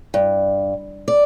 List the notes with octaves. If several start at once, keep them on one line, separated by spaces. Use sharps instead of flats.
G2
D5